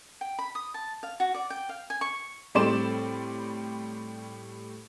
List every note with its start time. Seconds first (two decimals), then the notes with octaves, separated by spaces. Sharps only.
0.21 G5
0.39 B5
0.55 D#6
0.74 A5
1.03 F5
1.20 F#4
1.34 D5
1.50 G5
1.69 F5
1.90 G#5
2.01 C#6
2.55 A2 G3 C4 D5 C6 E7